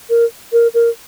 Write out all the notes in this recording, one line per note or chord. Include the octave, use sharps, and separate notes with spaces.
A#4
A#4
A#4